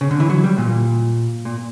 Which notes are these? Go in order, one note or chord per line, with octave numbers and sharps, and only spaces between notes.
C#3
D3
E3
F#3
G3
A#2
A#2